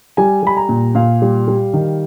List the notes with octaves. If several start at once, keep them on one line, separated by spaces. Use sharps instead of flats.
G3 G#5
G3 B5
A#5
A#2
A#2 F5
G3
G3
D#3